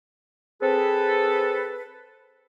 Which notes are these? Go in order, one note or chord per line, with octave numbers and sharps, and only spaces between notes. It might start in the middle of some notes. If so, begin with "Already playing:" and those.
C4 G#4 A4 B4